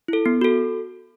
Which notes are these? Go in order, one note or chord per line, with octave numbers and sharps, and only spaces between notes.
E4 A4
B3
F#4 A4